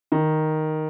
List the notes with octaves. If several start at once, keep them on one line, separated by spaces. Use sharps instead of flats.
D#3